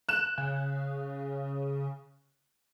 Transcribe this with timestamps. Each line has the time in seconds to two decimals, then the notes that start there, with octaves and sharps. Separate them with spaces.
0.09 F#6 E7
0.38 C#3